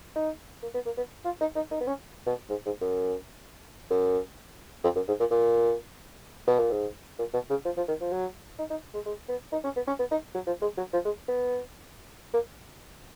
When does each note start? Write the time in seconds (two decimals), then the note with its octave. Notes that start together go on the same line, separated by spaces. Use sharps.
0.16 D#4
0.63 A#3
0.74 B3
0.86 A#3
0.97 B3
1.25 F4
1.41 D#4
1.56 D#4
1.71 D#4
1.81 B3
1.87 C#4
2.26 B2
2.50 G#2
2.66 G#2
2.81 F#2
3.90 F#2
4.84 F2
4.96 F#2
5.08 G#2
5.20 A#2
5.31 A#2
6.47 B2
6.59 A#2
6.71 G#2
7.19 A#2
7.34 B2
7.50 C#3
7.65 F3
7.77 F3
7.88 D#3
8.01 F3
8.12 F#3
8.59 D#4
8.71 D#4
8.94 G#3
9.06 G#3
9.29 B3
9.53 D#4
9.64 C#4
9.76 B3
9.88 C#4
9.99 B3
10.11 D#4
10.35 F#3
10.46 F3
10.62 G#3
10.78 F#3
10.93 F3
11.05 G#3
11.28 B3
12.34 A#3